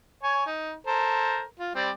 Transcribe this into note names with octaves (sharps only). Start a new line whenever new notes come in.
C#5 G#5
D#4
A4 A#4 C5
F4
G3 C4 D5